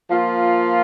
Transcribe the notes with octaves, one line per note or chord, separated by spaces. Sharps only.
F3 A#3 F4